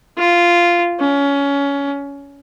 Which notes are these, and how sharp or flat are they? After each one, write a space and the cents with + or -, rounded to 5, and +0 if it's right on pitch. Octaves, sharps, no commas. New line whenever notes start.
F4 -10
C#4 +20